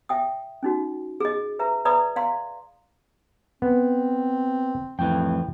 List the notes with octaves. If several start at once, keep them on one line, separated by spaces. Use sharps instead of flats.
E5 G5 D#6
C#4 D#4 F#4
G#4 D#5
B4 E5 A#5
B4 D5 E5 A#5 B5 D#6
D5 F5 A#5 C6
B3 C4
F2 A2 E3 G5